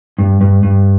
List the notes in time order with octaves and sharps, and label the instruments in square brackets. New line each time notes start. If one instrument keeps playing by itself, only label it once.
[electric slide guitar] G2
G2
G2